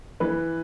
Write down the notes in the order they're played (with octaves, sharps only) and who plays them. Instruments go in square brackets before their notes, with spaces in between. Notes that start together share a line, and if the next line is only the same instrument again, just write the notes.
[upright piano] E3 B4